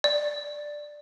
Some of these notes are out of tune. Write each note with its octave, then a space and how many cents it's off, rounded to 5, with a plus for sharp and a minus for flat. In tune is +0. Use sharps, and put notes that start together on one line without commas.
D5 +10